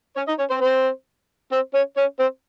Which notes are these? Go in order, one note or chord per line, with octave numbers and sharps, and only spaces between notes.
C#4 C#5
D#4 D#5
C#4 C#5
C4 C5
C4 C5
C4 C5
C#4 C#5
C#4 C#5
C4 C5